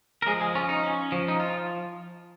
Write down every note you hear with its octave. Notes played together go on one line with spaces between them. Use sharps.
A#4
F3 G#3 G#4
G#3 G#4
C#4 F4
D#4
C#4
F3
D#4
F4